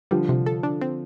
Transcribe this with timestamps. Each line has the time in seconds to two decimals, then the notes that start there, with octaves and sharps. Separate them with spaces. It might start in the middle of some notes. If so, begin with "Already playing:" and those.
0.11 D3 F3 G3
0.29 C3
0.46 A4
0.63 D4
0.82 C4